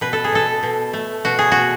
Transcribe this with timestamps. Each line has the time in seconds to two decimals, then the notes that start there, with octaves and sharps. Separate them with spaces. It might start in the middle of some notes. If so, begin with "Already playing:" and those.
0.01 B2 B4
0.13 A4
0.24 G#4
0.32 B2 A4
0.63 B2
0.93 A3
1.25 B2 F#4
1.39 G#4
1.52 B2 F#4